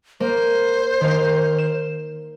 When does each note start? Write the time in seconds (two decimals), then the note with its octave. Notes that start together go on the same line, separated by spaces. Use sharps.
0.20 A#3 C5
1.01 D#3 F5
1.58 E7